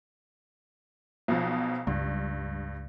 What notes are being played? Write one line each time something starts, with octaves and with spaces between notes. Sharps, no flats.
B1 B2 F3
C#2 G2